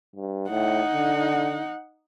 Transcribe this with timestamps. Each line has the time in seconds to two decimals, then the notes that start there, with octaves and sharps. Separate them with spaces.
0.16 G2
0.50 A2 D#4 F#5
0.93 D3